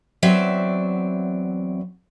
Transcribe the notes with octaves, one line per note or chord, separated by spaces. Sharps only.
E2 F#3 C4 D5 E5